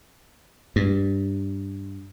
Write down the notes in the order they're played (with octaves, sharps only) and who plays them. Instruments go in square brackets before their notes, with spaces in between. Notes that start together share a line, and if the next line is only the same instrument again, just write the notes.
[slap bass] G2